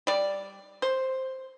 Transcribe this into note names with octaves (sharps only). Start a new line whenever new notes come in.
G3 D5
C5